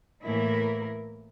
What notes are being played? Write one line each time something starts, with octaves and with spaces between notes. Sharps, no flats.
A2 E3 A#3 E4 A#4